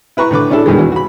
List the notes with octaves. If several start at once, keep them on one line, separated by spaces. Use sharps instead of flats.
E4 B4 A#5 C#6
A2 D3 B4 D6
C#4 D4 E4 A4
G2 B2 D#3 E3 G#3
E2 F#4
F#4 B5